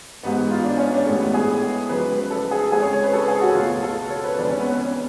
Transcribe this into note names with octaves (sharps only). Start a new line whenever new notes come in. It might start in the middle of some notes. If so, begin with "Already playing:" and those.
A1 G#2 G#3 B3
F4
D4
C#4
D4
A1 A2 G#3 A3
B3
G#4
F#2 C#3 F3 G#3 B4
B4
A4
G#4
F2 C#3 G#3 G#4
C#5
C#5
B4
A4
G#4
F#4
C#2 B2 A3 F4
A4
C#5
B4
F1 F2 D3 G#3 D4
C#4
B3
B3
C#4